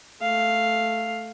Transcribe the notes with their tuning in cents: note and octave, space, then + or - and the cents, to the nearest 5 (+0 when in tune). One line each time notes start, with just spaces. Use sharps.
A3 +0 F5 +0